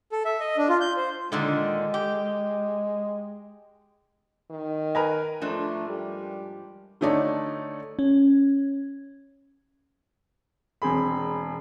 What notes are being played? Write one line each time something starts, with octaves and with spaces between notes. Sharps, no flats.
A4
E5
D#5
D4
F4
G6
C5
A#2 D3 D#3 G#3
G4
D#3
A#4 B4 D#5 G#5 A#5
G#2 F3 A3 D4
G3
D3 A3 D#4 C#5 D5
C#4
E1 C4 G#4 B5